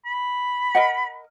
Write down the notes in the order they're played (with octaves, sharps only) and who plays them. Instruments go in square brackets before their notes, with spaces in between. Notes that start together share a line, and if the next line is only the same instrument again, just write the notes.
[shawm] B5
[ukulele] A#4 D#5 F#5